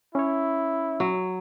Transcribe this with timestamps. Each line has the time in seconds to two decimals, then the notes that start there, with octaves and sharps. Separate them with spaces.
0.15 C#4 E4 C#5
1.00 F#3